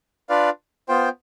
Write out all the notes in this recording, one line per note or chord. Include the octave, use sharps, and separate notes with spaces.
D4 F4 B4 D5 F5
B3 F4 C5 G5